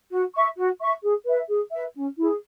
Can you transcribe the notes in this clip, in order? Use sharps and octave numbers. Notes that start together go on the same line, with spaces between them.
F#4
E5 C#6
F#4
E5 C#6
G#4
B4 E5
G#4
B4 E5
C#4
E4 G#4